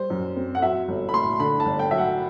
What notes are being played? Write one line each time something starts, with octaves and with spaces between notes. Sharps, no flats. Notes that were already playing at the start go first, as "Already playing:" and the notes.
Already playing: G3 C5
F#2
C4
F#5
F#3 E5
G1
B5
A3 C6
D3 B5
A5
G1
G5
F#3 E5
F#5